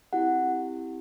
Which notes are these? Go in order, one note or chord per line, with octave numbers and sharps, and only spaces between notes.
C4 E4 G4 F#5